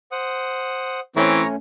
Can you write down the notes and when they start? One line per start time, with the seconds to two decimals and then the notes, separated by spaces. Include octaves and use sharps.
0.12 C5 F#5 D#6
1.16 E3 A3 C4 C#4 C#5 A#5